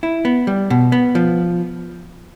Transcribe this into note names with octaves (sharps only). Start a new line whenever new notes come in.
E4
B3
G3
B2
B3
F3